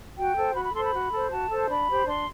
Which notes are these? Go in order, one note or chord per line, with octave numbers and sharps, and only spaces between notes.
F#4 G5
A4 C5
F#4 B5
B5
A4 C5 C6
B5
F#4
A4 C5
F#4 A5
A4 C5
D4 B5
G4 C5
D4 C6